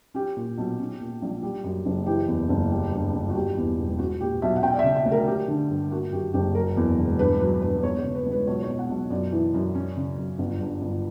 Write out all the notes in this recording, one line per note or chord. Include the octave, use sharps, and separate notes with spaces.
C#4 G4
A#2
B1
C#4
A#2
A#1
G3
F#2
F#1
E3 G4
E2
F#1
G3
G2
G1
F#4
G3 G4
E2
E1
C#4 F#4
A#2 G4
B1 E5
F#5
C#4 G5
D5
C#3 E5
E5
D2
A#4
C#4 G4
D3
G2
A#3 F#4
F#2 G4
F#1 G4
F#3 A#4
E2
E1
G2 B4
F#3 B4
G2 B4
B3 C#5
C#5
C#3
B4
C#2
B4
B1 C#5
C#5
B2
F#5
B1
F#2 D5
E3
F#2
C#4
C#3
F#2
G1
G2
G1